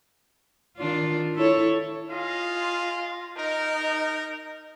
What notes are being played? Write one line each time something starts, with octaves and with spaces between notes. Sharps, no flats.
D#3 D4 F4
E4 A4 C#5
F4 G#4 D#5 F5
D#4 A#4